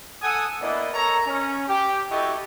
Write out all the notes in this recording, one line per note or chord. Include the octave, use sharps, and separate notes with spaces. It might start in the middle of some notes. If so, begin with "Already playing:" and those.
A4 F#5 G#5 D#6
A#3 B3 D4 E4 D5 D#5
A4 A#4 C#5 A#5
C#4
G4
A3 E4 F#4 G4 A4 D#5